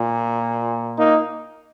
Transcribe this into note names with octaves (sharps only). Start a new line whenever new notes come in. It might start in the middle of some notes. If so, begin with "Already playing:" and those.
Already playing: A#2
A#3 D#4